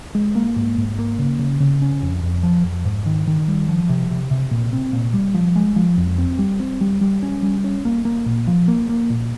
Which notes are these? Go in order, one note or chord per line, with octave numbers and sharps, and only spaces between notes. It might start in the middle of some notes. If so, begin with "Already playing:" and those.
G#3
A#3
G#2
G#2
A#3
C#3
C#3
C#3
C#4
F2
F2
F3
F2
G#2
D#3
D#3
G3
F3
C3
C3
C3
A#2
C4
A#2
G3
F3
G#3
F3
F2
C4
G3
C4
G3
G3
C#4
G3
C#4
A#3
A#3
A#2
F3
A#3
A#3
A#2